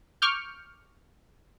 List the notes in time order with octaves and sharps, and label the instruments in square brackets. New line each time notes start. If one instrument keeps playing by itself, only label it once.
[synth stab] C#6 D6 F6 G6